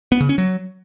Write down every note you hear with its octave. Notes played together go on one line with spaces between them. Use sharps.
B3
C#3
C#4
F#3